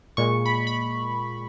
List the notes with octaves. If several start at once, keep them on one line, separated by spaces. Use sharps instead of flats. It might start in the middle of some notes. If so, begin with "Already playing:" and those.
A#2 G#3 C#6
B5
B5